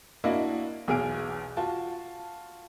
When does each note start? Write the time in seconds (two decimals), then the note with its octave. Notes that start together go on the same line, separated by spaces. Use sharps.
0.24 A#3 D4 E4 F#4 D#5
0.88 B1 E2 G#4 G#5 F6 D7
1.57 F4 F#4 A5